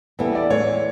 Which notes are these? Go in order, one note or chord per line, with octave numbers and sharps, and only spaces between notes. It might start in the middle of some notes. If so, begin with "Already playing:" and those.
E3 G3 B3 E4 A4
D5
A2 E3 G#3 C#5